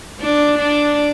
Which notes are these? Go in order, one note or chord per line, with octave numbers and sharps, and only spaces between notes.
D4
D4